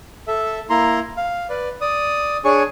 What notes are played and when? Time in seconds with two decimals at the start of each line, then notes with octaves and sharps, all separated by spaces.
0.28 A4 E5
0.70 A#3 E4 A#5 C6
1.17 F5
1.49 B4 D5
1.81 D5 D#6
2.45 D4 G#4 C#5 G#5 C#6